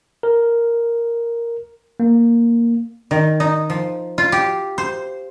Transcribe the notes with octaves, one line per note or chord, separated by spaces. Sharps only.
A#4
A#3
D#3
D#4
F3
F4
G4
C5